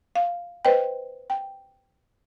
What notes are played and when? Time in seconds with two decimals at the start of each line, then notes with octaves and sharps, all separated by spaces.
0.15 F5
0.65 B4 C5 D#5 G5
1.30 G5